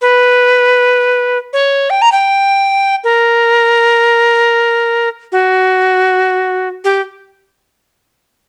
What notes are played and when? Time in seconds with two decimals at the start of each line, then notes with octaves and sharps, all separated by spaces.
0.01 B4
1.53 C#5
1.90 G5
2.02 A#5
2.12 G5
3.04 A#4
5.32 F#4
6.84 G4